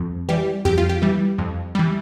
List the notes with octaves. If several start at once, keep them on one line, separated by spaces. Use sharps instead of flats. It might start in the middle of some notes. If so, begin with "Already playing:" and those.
Already playing: F2
E3 G3 G4
F2 G4
F4
G4
E3 G3
F2
E3 G3